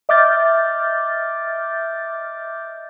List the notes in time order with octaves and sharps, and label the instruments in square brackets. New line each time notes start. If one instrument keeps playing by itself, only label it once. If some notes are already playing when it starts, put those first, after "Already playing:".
[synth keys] D#5 E5 D6 F6 G6 A6